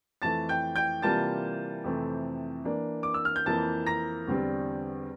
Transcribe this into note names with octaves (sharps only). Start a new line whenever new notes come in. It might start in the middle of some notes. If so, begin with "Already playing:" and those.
F2 E3 A3 A5 A6
G5 G6
G5 G6
C3 E3 G3 A#3 F4 A5 A6
F2 C3 E3 A3 C4
E3 A#3 D4
D6
E6
F6
G6
F2 E3 A#3 E4 A5 A6
A#5 A#6
E2 D3 G3 C4